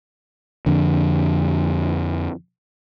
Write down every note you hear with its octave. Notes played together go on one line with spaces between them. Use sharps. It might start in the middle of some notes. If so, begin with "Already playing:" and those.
F2 D3